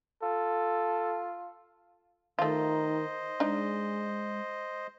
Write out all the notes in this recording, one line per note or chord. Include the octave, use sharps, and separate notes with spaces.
F4 A4
D#3 A3 F4 C5 D#5
G#3 D4 D#4